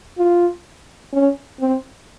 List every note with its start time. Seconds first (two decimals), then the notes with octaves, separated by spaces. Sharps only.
0.18 F4
1.13 C#4
1.60 C4